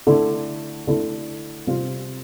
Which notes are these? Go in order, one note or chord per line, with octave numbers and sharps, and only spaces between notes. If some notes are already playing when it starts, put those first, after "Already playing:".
D3 A3 E4
D3 A3 E4
C3 G3 C4 F4